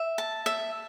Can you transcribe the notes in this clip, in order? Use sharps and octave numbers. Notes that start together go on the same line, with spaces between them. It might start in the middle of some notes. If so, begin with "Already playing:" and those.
Already playing: E5
A5
E5